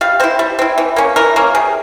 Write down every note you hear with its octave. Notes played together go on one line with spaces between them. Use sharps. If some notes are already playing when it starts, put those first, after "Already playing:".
G3 F5
C4 E4 C5
G3
C4 E4
E3
A#3 C#4
E3 A#4
A#3 C#4
C3 G#4